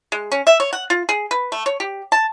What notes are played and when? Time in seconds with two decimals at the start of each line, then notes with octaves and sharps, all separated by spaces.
0.12 G#3
0.32 C#4
0.47 E5
0.60 C#5
0.73 F#5
0.90 F4
1.09 G#4
1.31 B4
1.52 A3
1.66 C#5
1.80 G4
2.12 A5